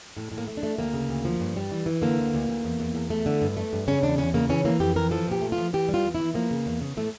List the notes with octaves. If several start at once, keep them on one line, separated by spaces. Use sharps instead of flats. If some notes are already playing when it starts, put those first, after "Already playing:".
A2
A2
A#3
A3
D4
A3
D2 A#3
C#3
D2
F3
G2
G3
E3
E3
D3 A#3
D2
D2
D2
E2
E2
E2
A3
D3
G2
A3
G2
C#3 C#4
E2 D4
E2 C#4
C#3 A#3
E3 C#4
E3 A#3
F2 G4
E3 A#4
F3 A4
A#2 G4
A3
F4
F3
E3 G4
G3
F4
E2
E4
E3
F3 A#3
C#3
E2
C#3
A2 A3